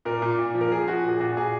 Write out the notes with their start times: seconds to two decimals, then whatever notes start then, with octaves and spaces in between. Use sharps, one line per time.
0.05 A#2 A#4
0.22 A#2
0.39 A#2
0.54 F3
0.61 A#4
0.72 F3 G#4
0.87 F3 F#4
1.04 A#2 G#4
1.20 A#2 F#4
1.37 A#2 G#4